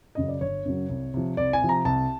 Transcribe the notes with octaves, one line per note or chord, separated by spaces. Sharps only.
F#2 C#3 F#3 D#5
D5
G1 C#5
F#2 C#3 F#3
C2
C3 F3
C2 D5
G#5
C3 F3
A#5
C2 A5